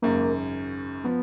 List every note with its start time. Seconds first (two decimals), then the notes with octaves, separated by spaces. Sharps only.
0.02 G#1 F#2 C#3 A#3
1.04 F3 B3